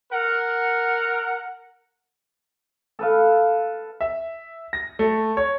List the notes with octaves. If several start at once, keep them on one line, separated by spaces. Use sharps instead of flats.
A#4 F#5
A4 B4 F5
E5
A#6
A3
C#5